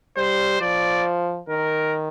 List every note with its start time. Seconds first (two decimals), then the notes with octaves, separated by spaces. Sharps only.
0.17 G3 C5
0.61 F3 D5
1.49 D#3 A#4